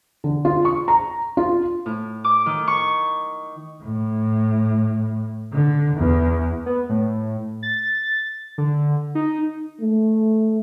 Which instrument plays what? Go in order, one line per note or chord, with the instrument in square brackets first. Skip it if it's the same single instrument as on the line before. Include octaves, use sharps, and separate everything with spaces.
[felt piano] D3
F4
C#6
A#5
F4
[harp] A2
D6
D#3
C#6
[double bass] A2
D3
E2
[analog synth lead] B3
A2
A6
D3
D#4
[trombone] A3